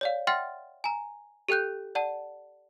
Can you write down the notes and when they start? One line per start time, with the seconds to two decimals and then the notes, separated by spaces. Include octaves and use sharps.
0.01 C#5 D5 F5
0.27 E5 F#5 G5 C6 F6 A6
0.84 G#5 A#5
1.49 G4 A4 G5 F#6 G6
1.95 D5 F#5 A5